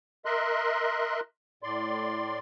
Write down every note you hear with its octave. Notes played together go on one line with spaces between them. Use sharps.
A#4 D#5 E5 C6 F#6
A2 D5 C6